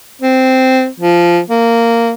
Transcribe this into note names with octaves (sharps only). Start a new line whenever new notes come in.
C4
F3
A#3